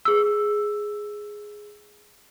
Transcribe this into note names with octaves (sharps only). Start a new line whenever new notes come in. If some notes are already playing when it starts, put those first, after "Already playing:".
G#4 E6